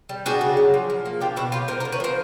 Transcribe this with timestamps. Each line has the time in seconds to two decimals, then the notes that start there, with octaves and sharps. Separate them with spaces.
0.09 G3
0.26 D4 F#4 G#4
0.41 C#3
0.57 F#3
0.74 F3
0.90 F3
1.05 A#3
1.20 D4 F4 G4
1.36 B2 E4 F#4
1.52 F#3 F4 G4
1.68 D3 A#4 C5
1.80 A#4 C5
1.85 D3
1.92 B4 C#5
2.00 F3 A#4 C5